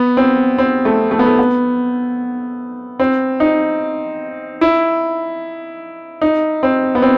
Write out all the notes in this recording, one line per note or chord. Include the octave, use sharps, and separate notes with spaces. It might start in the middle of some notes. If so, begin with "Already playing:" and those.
Already playing: B3
C4
C4
A3
A3
B3
A3
B3
C4
D#4
E4
D#4
C4
B3
C4